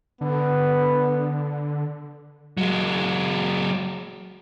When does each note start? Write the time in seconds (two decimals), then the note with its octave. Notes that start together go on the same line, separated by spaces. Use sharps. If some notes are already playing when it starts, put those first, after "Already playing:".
0.21 D3 B3
2.57 F#3 G#3